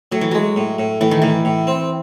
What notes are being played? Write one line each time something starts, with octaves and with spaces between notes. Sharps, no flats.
A2 F#3
E3
F#3 G#3
A2
A2
A2 E3
D#3
A2 E3
A2
C4